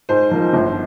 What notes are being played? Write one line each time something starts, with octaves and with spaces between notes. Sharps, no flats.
G#2 C5
F3 A#3 D#4
G1